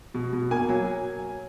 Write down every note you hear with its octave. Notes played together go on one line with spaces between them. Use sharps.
B2
B2
A#3 G#5
F#3